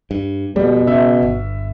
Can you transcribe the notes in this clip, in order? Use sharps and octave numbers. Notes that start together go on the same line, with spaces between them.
G2
F2 B2 G3
C#3 E5
G1